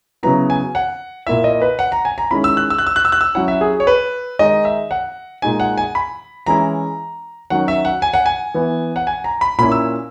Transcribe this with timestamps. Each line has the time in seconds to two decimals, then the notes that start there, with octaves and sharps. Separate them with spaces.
0.23 C#3 F#3 B3 E4 A#5
0.50 G#5
0.75 F#5
1.27 A#2 A#3 E4 E5
1.44 D#5
1.62 B4
1.79 F#5
1.92 A#5
2.05 G#5
2.18 A#5
2.31 D#3 G#3 C#4 E4 B5
2.44 E6
2.57 F#6
2.70 E6
2.78 F#6
2.87 E6
2.96 F#6
3.05 E6
3.12 F#6
3.21 E6
3.35 F#3 C#4 E4 F#5
3.48 E5
3.61 G#4
3.80 C#5
3.87 B4
4.39 D#3 G#3 D#4 D#5
4.65 E5
4.91 F#5
5.42 A#2 G#3 D#4 G#5
5.60 F#5
5.78 G#5
5.95 B5
6.46 E3 G#3 C#4 E4 A#5
7.50 D#3 F#3 C#4 F#5
7.68 E5
7.85 F#5
8.02 G#5
8.14 F#5
8.26 G#5
8.54 E3 B3 E4
8.96 F#5
9.07 G#5
9.24 A#5
9.41 B5
9.58 A#2 A#3 C#4 E4 B5
9.72 E6